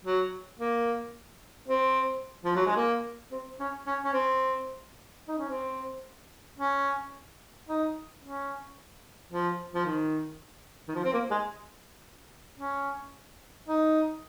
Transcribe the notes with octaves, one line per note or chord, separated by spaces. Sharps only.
F#3
A#3
C4
F3
F#3
G#3
A#3
C4
C#4
C#4
C#4
C4
D#4
C#4
C4
C#4
D#4
C#4
F3
F3
D#3
D#3
F3
C4
A#3
G#3
C#4
D#4